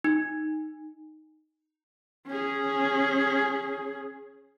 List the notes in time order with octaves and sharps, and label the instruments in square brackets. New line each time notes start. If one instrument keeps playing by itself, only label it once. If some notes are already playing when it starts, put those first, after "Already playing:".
[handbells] D#4
[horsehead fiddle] C#4 G#4